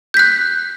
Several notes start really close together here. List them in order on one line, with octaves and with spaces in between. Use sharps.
G6 B6 F#6